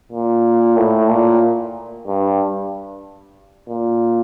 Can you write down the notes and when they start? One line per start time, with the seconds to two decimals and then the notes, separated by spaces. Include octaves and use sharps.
0.12 A#2
0.77 A2
1.10 A#2
2.07 G2
3.69 A#2